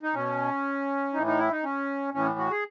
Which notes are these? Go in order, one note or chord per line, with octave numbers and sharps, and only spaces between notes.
D#4
B2 C#4
A2 E3 D#4
D#4
E4
D#4
C#4
A2 E3 C#4
F#4
G#4